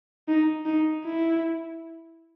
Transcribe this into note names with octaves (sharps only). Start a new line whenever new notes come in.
D#4
D#4
E4